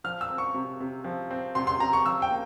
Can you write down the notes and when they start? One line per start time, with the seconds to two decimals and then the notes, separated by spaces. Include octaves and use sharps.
0.04 F3 F6
0.21 E6
0.30 C4
0.38 C#6
0.54 C3
0.80 C3
1.04 F3
1.31 C4
1.55 C3 C6
1.67 C6
1.80 C3 A#5
1.93 C#6
2.05 F3 E6
2.22 G5
2.30 A#3